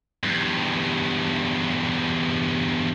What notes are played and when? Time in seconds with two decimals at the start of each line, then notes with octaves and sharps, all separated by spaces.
0.23 E2 G2